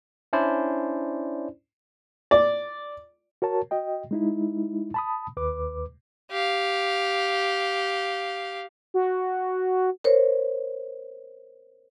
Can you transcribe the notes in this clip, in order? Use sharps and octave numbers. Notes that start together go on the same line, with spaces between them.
C#4 D4 E4 C5 D5
D5
F#4 A#4 C#5 A5
F#4 D#5 G5
G#3 D#4 E4
A5 B5 D#6
D#2 B4 D6
G4 F5
F#4
A#4 C5 C#5